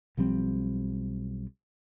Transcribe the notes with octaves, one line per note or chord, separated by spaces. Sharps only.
B1 F3 G3 C4